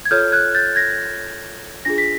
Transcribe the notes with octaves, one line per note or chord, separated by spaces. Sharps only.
G#6
F4 A4 C#5 F6 G6
F#6 G#6
G6 A6
G#6 A#6
D4 F4 G#4 A#6
B6